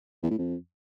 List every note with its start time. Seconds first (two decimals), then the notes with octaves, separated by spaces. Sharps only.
0.23 E2
0.31 A2
0.38 F2